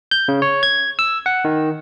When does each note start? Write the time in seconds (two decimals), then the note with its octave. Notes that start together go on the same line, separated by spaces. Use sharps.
0.11 G6
0.28 C#3
0.42 C#5
0.63 G#6
0.99 E6
1.26 F#5
1.45 D#3